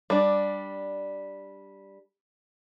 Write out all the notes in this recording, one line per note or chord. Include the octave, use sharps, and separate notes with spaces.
G3 D4